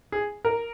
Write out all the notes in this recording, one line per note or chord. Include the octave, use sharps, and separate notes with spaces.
G#4
A#4